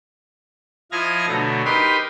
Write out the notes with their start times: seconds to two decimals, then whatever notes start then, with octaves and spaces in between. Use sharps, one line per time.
0.92 F3 E4 D#5 F5 G#6 A#6
1.27 B2 D3 F#3 A3
1.65 D#4 G4 A#4 B4 B5 C6